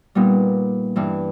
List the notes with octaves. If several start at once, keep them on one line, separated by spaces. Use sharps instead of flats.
A#2 G3 B3 D#4
G2 E3 G3